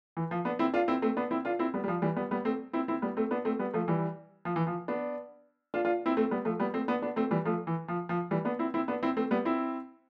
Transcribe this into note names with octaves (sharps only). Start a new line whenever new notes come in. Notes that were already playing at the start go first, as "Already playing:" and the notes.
E3
F3
B3 D4
C4 E4
D4 F4
C4 E4
A3 C4
B3 D4
C4 E4
D4 F4
C4 E4
G3 B3
G3
F3
E3 G3
G3 B3
G3 B3
A3 C4
C4 E4
C4 E4
G3 B3
A3 C4
B3 D4
A3 C4
G3 B3
F3 A3
E3 G3
F3
E3
F3
B3 D4
D4 F4
D4 F4
C4 E4
A3 C4
G3 B3
F3 A3
G3 B3
A3 C4
B3 D4
B3 D4
A3 C4
E3 G3
F3 A3
E3
F3
F3
E3 G3
B3 D4
C4 E4
C4 E4
B3 D4
C4 E4
A3 C4
G3 B3
C4 E4